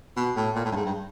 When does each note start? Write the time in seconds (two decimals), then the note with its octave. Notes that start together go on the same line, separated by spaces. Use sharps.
0.17 B2
0.36 A2
0.55 A#2
0.65 A2
0.72 G2
0.76 G#2
0.85 G2